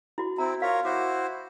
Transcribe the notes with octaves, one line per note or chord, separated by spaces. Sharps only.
E4 F#4
C4 E4 A#5
F4 A#4 C#5 F5
E4 F#4 C5 D6